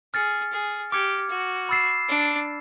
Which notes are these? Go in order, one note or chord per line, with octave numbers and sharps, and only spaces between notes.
G#4 F6 A6 C#7
G#4
G4 D6 F6 G#6 C#7
F#4
B5 E6 A6 C7 E7
D4